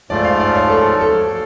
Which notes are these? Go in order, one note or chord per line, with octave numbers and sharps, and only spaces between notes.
G#2 F3 A3 F4 D5
F5
D5
C#5
A4
A4